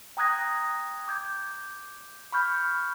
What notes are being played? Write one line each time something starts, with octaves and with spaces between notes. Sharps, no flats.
G5 A#5 D#6 F#6 G#6 A#6
D6 G6 G#6
B5 C#6 F6 G6